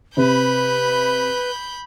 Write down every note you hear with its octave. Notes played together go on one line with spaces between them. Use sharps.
C3 B4 B5 G6